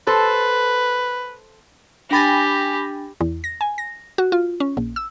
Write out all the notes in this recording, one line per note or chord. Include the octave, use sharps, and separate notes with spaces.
A4 B4 C5
D4 G4 G5 G#5 B5 A6 A#6
E2
A#6
G#5
A#6
F#4
F4
C#4
A#1
E6